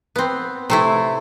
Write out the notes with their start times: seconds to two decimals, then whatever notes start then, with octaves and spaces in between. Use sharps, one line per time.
0.16 B3 C4
0.70 C3 A3 E4